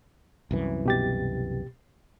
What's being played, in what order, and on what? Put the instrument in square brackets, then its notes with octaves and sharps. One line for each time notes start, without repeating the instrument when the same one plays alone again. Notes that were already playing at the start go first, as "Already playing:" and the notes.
[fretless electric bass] C2 F#2 E3
[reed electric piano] B2 G4 A6